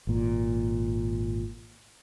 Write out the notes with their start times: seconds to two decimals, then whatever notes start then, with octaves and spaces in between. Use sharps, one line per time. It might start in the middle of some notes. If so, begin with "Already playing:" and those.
0.07 G#1 A#2